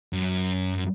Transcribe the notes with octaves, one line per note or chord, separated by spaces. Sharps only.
F#2